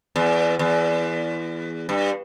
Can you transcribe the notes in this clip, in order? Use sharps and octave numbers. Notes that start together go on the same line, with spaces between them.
E2
E2
G2